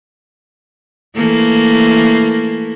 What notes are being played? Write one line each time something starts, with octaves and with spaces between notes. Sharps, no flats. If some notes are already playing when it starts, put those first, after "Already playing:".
E3 A3 A#3